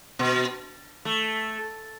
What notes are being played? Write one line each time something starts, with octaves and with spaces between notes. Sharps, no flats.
B2
A3